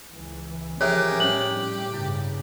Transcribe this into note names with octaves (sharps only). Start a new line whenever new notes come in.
C#2 E3
E3 F3 C#4 G4 G#4 A#4 C#5 E5
A2 G3 C#4 D#4 G4 C5 F#7
G2 C#3 E4